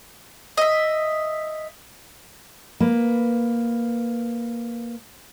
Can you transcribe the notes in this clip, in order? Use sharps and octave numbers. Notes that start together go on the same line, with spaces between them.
D#5 E5
A#3 B4